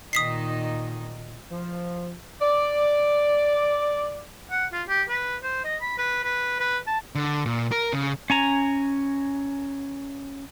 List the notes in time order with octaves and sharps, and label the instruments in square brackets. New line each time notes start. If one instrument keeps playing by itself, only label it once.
[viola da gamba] A#2 D#3 D#4 [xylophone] D#6 B6 C7
[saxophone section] F3
D5
[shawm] F#5
F4
G4
B4
C5
D#5
B5
B4
B4
B4
A5
[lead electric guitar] D3
A#2
A#4
C#3
[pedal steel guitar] C#4 G#5 A#5